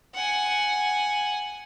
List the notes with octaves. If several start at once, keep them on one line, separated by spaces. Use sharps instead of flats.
F#5 G#5